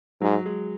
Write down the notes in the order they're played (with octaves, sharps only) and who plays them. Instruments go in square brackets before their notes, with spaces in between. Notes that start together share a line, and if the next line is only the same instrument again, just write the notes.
[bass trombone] G#2 [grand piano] F#3
[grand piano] G#3